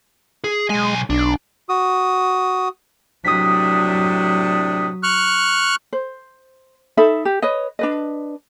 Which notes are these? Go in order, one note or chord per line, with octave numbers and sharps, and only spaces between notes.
G#4
B1 G#3 G#5
B1 D4
F#4 D#6
A2 C3 F#3 D4 D#6 B6
C#6 F6 F#6
C5
D#4 A4 E5 B5
G4
B4 C#5 D#5
D4 B4 D#5